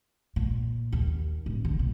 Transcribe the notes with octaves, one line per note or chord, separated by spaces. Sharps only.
A#2
D#2
D1
D3
B2